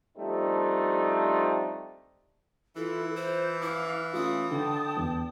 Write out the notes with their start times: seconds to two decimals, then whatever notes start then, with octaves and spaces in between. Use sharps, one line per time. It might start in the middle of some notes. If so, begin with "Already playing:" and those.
0.18 F3 G3 A3 C4 D4 D#4
2.76 E3 E4 F4 A4
3.16 F4 C5
3.62 E4 F5 D6
4.13 A3 C#4 F4 D#6
4.51 D3 G5 A5
4.97 E2